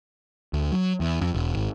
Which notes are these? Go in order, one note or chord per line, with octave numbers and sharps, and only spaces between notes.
D2
F#3
E2
F2
E1
G#1